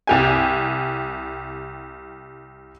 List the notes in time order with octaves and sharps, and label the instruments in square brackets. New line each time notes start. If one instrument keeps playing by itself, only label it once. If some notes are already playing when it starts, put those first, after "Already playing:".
[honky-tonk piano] C2 G4 G#5